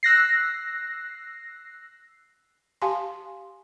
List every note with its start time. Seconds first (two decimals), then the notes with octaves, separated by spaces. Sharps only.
0.03 E6 F#6 A#6 C7
2.82 G4 F5 G#5 A5 C6